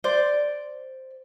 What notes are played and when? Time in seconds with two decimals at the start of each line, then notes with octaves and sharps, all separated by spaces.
0.04 C5 D5